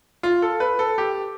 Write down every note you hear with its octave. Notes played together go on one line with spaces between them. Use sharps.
F4
A4
B4
A4
G4